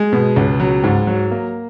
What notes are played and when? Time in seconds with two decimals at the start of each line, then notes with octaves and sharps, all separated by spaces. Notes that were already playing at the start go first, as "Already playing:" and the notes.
Already playing: G#3
0.13 B2
0.36 C#2
0.60 F#3
0.84 G#2
1.07 F#3
1.31 A#3